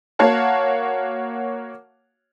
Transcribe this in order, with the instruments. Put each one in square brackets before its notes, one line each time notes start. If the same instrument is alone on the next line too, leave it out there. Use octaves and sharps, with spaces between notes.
[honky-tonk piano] A#3 F#4 C#5 F5 F#5 A5